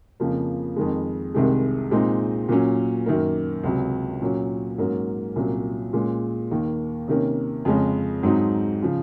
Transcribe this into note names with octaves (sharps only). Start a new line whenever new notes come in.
F2 C#3 F3 A#3
F2 D#3 G#3
C2 C3 D#3 G#3
A#2 G#3 C4 D#4
A#2 F#3 C#4
F#2 D#3 A#3
C#2 C3 F#3 C#4
A#2 F#3 C#4
G#2 F#3 A#3 C#4
C2 A#2 F#3 C#4
A#2 G#3 C#4
D#2 D#3 A#3
C3 D#3 A#3 C#4
F2 C#3 G#3 C#4
G#2 F#3 C4 D#4
C#3 F3